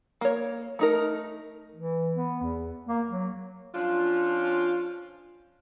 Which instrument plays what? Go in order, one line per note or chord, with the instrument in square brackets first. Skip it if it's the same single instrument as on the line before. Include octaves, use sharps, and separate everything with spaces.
[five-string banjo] A#3 C#5
A3 D#4 A#4
[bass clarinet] E3
B3
E2
A#3
F#3
[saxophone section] F3 C#4 D4 F4